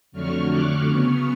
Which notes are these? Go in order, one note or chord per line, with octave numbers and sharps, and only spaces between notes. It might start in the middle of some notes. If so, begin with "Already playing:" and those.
F2 D3 F#3 A3 C#6 F6
D6 F#6
C#3 F#3 B3 C#6 F6